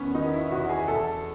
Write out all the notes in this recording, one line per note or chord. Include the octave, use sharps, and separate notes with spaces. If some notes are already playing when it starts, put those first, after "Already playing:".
Already playing: E2 D#3 B3 C#4
D#3 D#4
E4
E2 F#4
G#4
E2 A4